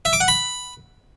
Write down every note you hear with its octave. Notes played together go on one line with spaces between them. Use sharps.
E5
D6
F#5
B5